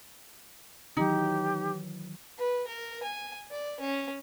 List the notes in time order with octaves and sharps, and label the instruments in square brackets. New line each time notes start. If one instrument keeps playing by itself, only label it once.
[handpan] D#3 E3 F#3 [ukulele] D#4 [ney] G4
[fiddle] B4
A#4
G#5
D5
C#4